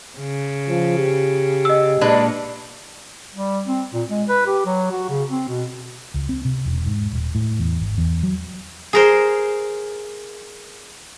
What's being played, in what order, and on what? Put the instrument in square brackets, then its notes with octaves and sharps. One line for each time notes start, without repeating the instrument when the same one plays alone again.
[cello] C#3
[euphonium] F3
G4
[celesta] D#5 E6
[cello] A#2 [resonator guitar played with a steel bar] G#3 D4 B4
[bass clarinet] G3
C4
A#2
G#3
B4
G4
F#3
F#4
C#3
C4
B2
[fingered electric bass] C#2
C4
C3
E1
G#2
D#1
A2
E2
G#1
E2
F#3
[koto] G#4 A#4 C5